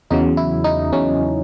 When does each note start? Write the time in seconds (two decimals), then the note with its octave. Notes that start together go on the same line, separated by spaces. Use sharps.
0.11 E2 C#3 F#3 D#4
0.37 E4
0.64 D#4
0.93 E2 C#3 F#3 C#4